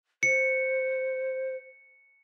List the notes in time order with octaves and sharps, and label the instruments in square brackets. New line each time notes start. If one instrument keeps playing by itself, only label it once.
[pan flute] C5 [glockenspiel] C#7